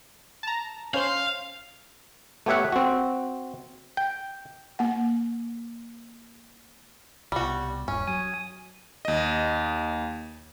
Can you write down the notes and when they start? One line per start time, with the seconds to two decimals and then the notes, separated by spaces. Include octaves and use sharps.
0.43 A5 A#5
0.94 C#4 C5 F5 C6
2.46 A3 B3 G4 C#5 E5 F#5
2.72 C4 F#4
3.97 G5
4.79 A#3 F#5
7.32 C2 B2 G3 F#4
7.88 D#1 G2 C#4
8.08 F#3 G#5 D#6
9.05 D#2 D#5